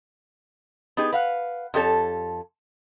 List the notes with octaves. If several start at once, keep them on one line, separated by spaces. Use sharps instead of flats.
B3 D#4 G4 G#4
B4 F5 F#5
F2 G4 A4 C#5 A5